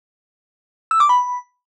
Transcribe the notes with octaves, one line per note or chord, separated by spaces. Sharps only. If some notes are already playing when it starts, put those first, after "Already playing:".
E6
D6
B5